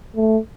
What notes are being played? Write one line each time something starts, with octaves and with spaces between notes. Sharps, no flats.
A3